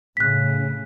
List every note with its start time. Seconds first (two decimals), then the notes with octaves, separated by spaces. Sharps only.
0.17 A2 C#3 F#6 B6